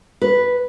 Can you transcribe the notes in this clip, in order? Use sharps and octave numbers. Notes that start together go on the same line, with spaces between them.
B4